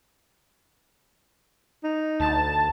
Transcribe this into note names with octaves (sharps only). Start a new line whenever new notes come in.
D#4
D2 A5